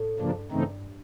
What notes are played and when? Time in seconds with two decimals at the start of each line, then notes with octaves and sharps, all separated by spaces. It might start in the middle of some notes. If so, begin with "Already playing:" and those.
Already playing: A2
0.19 G2 C#3 F3 A#3 D4
0.51 G2 C#3 E3 A3 C4 D#4